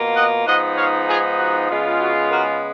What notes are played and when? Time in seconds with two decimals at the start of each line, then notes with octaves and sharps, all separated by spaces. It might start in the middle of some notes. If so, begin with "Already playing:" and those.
Already playing: B2 A#3 F4
0.15 D#5 F#5
0.46 G#2 F3 B3 D#4 D#5 F#5
0.76 C#5 F5
1.08 F4 G#4
1.38 F#4
1.70 C#3 G#3 B3 F4
2.00 F#4
2.32 F#4 A#4